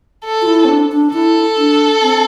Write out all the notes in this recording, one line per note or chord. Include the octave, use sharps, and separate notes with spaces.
A4
F4
E4
C4
D4
D4
E4 A4
D4
C4